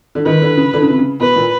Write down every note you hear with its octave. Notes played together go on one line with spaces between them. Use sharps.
D3
D#3 B4
D3
C#3
D3
C#3
C3
C#3
B2 B4
A#2